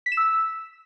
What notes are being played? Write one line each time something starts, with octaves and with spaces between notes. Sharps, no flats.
B6
E7
E6